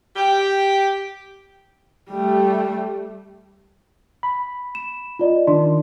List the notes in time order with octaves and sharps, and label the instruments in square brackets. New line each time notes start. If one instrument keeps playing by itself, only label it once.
[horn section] G4 G5
[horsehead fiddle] G3 A3
[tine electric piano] B5
[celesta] E7
F4 D5 D#5
[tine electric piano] D#3 D4 [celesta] C6